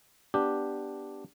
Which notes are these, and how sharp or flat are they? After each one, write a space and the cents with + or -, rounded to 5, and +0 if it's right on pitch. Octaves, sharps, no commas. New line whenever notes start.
B3 +0 D4 +0 G4 +0